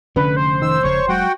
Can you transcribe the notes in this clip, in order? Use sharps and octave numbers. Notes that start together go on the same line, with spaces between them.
F1 D3 C#4 B4
C5
D#3 E6
E1 C#2 C#3 F3 C#5 C#6
F#3 G#3 F#4 F#5 G5